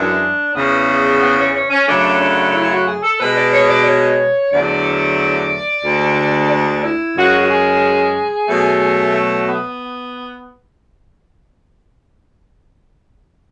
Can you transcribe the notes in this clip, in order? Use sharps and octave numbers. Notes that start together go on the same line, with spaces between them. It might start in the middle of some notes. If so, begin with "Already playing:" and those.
Already playing: F#2 E3 G#3 D4
E2 C#3 E3 B3
B3
C#4
C#4
C#4
F#2 C#3 F#3 A3 D4
D4
E4
F#4
G#4
A4
B2 G#3 B4
D5
C#5
D5
C#5
E2 D3 F#3 A3 D5
D2 D3 G#3
D5
E4
F#2 C#3 G#3 F#4
F#4
G#4
B2 F#3 A3
A3
B3